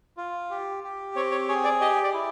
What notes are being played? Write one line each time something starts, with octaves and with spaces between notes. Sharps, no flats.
F4
G4
G4
C4 C#5
C#5
G#4 C#5
D5
G4 D#5
D5
E4